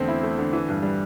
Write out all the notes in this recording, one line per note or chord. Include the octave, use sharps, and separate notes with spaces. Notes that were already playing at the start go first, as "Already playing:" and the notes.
Already playing: E2 D3 A3 C4
E4
A3
D3
E3
G2
G3